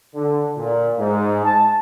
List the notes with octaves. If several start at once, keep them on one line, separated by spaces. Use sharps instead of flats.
D3
A#2
G#2
A5